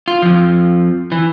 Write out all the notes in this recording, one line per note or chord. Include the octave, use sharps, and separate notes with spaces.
F4
F2 F3
E3